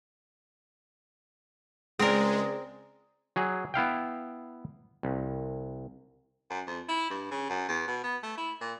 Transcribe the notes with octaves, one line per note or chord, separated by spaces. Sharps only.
C#2 G#3 C4 G#4 A#4 D5
F#3 G#4
B3 E4 F5 G5
C2
F#2
F2
E4
G2
C#3
F#2
E2
B2
B3
A3
E4
A#2